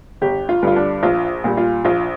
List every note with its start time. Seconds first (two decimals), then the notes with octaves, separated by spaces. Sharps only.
0.22 G1 G4
0.49 F4
0.63 G2 D3 G3 F4
0.76 D4
1.03 A#1 F4
1.44 A#2 G3
1.57 F4
1.85 A#1 F4